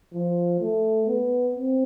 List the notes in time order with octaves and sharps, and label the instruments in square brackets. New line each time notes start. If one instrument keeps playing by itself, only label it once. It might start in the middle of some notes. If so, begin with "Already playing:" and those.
[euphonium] F3
A3
B3
C4